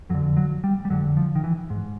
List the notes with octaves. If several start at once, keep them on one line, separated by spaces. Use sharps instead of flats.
F2 D3 F#3
F#3
G3
G3
F2 D3 F#3
F3
D#3
E3
G#2